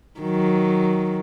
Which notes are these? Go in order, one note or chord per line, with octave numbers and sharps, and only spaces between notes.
D#3 F#3